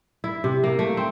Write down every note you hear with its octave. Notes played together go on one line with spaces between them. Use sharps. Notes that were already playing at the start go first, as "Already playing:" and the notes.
E4
C3
A#3
A3
C4